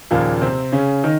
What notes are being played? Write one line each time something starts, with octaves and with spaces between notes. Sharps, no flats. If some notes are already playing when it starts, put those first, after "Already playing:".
D#2 A#2 C#3 F3 A#3
C3 C4
C#3 C#4
D#3 D#4